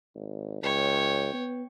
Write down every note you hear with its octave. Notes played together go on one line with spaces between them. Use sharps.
G#1
C#2 C#5 G5
B3